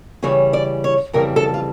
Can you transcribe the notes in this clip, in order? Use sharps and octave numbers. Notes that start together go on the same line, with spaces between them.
C#3 E3 G3 C#4 C#5
D5
C#5
F2 C#3 E3 G3 A#4
A4
F4